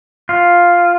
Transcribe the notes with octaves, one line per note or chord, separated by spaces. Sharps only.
F4